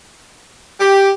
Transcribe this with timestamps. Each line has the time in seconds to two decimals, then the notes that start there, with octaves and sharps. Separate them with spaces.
0.80 G4